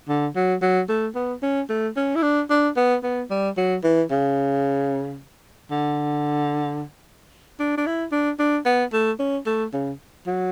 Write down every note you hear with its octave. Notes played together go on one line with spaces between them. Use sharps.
D3
F#3
F#3
A3
B3
C#4
A3
C#4
E4
D4
D4
B3
B3
G3
F#3
E3
C#3
D3
D4
D4
E4
D4
D4
B3
A3
C#4
A3
C#3
F#3